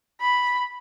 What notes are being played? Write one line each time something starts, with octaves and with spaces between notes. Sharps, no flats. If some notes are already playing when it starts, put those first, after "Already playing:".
B5